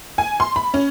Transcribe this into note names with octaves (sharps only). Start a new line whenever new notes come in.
G#5
C6
B5
C#4